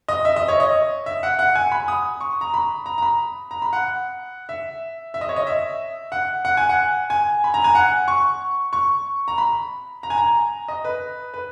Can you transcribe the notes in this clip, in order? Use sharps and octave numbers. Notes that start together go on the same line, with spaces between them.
D#5
E5
D#5
C#5
D#5
E5
F#5
F#5
G#5
B5
D#6
C#6
A#5
B5
A#5
A#5
B5
A#5
B5
F#5
E5
E5
D#5
C#5
D#5
E5
F#5
F#5
G#5
F#5
G#5
B5
A#5
G#5
F#5
C#6
C#6
A#5
B5
A#5
G#5
A#5
D#5
B4
B4